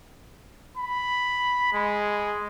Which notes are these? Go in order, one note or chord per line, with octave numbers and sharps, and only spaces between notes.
B5
G#3